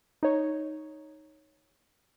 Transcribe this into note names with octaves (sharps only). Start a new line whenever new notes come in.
D#4 C#5